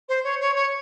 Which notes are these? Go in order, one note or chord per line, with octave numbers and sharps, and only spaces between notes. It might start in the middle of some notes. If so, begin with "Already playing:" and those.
C5
C#5
C#5
C#5